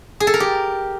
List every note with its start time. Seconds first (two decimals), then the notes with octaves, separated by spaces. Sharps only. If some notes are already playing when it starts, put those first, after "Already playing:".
0.20 G#4
0.27 A4
0.34 A#4
0.40 G4